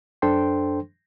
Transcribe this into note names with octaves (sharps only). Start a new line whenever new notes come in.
F#2 D4 A4 C5 G5 C6